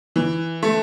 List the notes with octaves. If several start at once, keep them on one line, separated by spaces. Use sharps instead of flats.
E3
A3